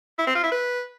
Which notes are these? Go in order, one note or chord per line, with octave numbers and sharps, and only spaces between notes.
E4
C4
F4
E4
B4